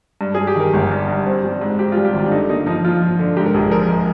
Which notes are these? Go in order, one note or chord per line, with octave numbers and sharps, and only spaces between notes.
G2
G#4
G2
G4
D#3 A#4
G1
G2
G2
C4
G3
G#2
C4 G4
F4
G3
G4
G#1 F4
D4
D3 D#4
A#3 D#4
F3 D#4
F3 F4
F3
D3
G#2 G4
A#4
A#1 G#4
F3 A#4
G#3